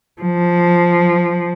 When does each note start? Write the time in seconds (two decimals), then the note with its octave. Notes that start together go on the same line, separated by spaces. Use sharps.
0.21 F3